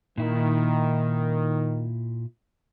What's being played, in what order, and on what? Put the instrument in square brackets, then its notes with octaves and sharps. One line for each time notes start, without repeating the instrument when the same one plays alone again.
[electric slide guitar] A#2 E4 [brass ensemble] D#3